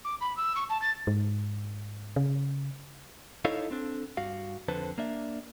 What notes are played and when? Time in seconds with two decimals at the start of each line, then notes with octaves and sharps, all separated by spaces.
0.05 D6
0.21 B5
0.37 E6
0.56 C#6
0.70 A5
0.82 A6
1.07 G#2
2.16 C#3
3.45 D#4 E4 A4 C#5 D#5 F5
3.71 C4 D4 A4
4.17 G2 F#4 F5
4.69 F2 D3 B4 C5 A5
4.98 A#3 D4 E5